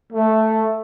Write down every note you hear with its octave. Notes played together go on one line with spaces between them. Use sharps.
A3